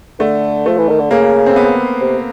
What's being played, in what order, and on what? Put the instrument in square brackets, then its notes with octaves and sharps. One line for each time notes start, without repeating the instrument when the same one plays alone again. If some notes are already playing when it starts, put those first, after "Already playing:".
[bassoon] D3 [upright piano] A3
[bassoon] F3 [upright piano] A3
[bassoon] E3
D#3
D3
[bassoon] C#3 [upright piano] A#3
[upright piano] C4
B3
[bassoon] C3